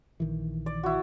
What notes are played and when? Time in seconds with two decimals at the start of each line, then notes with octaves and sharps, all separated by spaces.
0.20 A#1 D#3 E3
0.66 D5
0.83 E4 F#4